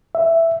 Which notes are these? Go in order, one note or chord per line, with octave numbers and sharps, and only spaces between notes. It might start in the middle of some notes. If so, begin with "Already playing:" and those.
E5